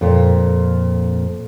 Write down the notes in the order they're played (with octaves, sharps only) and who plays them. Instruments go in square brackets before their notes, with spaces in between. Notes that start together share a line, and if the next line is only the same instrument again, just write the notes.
[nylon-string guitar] F2 A#2